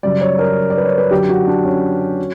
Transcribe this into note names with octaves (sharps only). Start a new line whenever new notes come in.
F#2 C#3 G3 D5
C#5
A#4
D5
B4
C#5
B4
F#2 D3 F#3 G4
F#4
D4
C#4
F#3